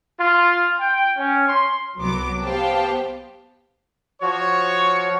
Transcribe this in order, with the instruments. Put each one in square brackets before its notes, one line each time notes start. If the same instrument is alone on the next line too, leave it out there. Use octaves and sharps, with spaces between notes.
[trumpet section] F4
G5
C#4
C6
[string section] C2 F#3 B3 D6
B3 G4 C5 F5 G5 A5
[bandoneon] F3 F#4 [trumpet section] C#5